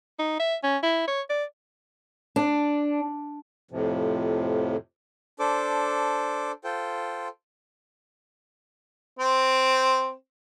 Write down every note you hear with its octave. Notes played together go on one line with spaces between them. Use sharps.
D#4
E5
C#4
E4
C#5
D5
D4
F2 A2 C3 F3
D4 A4 C5 D6
F4 A4 C5 G5
C4